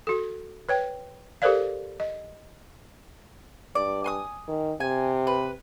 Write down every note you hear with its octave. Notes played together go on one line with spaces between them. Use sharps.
F#4 A4
B4 C#5 G5
G4 A4 A#4 C5 D5 F5
D#5
G2 D5
G#5 C6 D#6
D#3
C3 G#5
B4